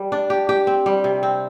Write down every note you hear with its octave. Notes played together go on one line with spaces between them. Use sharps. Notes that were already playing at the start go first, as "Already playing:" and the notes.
Already playing: G3
D4
G4
G4
C4
G3
C3
C4